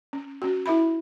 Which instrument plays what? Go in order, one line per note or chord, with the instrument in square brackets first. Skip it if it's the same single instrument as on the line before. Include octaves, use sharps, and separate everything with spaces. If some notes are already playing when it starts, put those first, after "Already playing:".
[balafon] C#4
C#4 F#4
E4 E5 B5